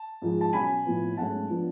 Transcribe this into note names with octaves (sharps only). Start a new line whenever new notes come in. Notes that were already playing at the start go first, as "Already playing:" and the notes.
Already playing: A5
G#2 F3 G#3
A5
B2 F#3 C#4 G#5 B5
A2 F3 B3
G#2 F#3 A3 C#4 F#5 A5
F3 B3 D4